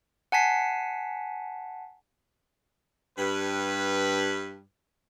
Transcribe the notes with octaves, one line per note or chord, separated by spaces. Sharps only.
F#5 G#5 A5 B6 C7
G2 B4